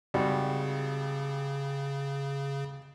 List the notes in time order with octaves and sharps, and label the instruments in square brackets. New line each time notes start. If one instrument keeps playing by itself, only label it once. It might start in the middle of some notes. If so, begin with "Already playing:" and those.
[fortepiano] G#1 G3 F#4 [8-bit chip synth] C#3